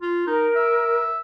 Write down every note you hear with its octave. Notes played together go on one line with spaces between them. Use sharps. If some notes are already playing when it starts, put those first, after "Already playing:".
F4
D#4 A#4
E5